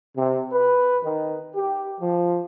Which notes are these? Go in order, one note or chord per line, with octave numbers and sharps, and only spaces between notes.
C3
B4
D#3
G4
F3